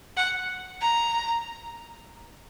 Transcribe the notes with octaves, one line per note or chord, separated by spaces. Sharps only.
F#5
A#5